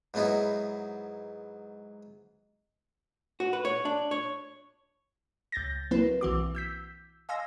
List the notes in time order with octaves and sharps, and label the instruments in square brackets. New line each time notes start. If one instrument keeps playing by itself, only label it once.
[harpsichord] G#2 F#3 B3 D#4 E4
[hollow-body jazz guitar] F#4
B4
C#5
D4
C#5
[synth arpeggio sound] C#2 G6 A6 A#6
F#3 A#3 C4 E4 B4
B1 E3 F#4 D6
E6 G6 B6
D#5 F5 G#5 C6 E6 A#6